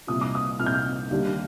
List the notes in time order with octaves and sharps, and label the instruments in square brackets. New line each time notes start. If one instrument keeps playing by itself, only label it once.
[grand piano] C2 A#2 F3 D#6
D6
D#6
C2 A#2 F3 F6
G6
F6
D#2 D#3 G3 D4